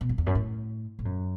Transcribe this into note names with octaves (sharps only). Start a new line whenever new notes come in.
B2
F#2
E2
F#2
A2
A2
F#2